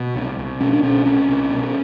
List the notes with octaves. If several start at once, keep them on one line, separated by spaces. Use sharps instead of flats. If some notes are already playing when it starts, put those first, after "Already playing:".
Already playing: B2
C2
C2
B2 C#4
D4
B2 C#4
C2 C#4
C2
B2